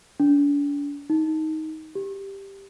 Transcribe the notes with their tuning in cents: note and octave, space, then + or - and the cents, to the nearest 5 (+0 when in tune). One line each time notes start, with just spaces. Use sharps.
D4 -40
D#4 +15
G4 +5